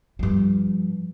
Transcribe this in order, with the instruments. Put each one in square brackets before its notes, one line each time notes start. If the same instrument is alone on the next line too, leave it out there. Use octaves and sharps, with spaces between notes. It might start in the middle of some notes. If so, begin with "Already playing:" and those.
[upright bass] G2 F3